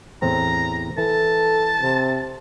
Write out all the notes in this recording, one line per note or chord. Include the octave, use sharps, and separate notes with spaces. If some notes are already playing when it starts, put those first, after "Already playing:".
E2 A2 C4 A#5
E3 A4 A5
C3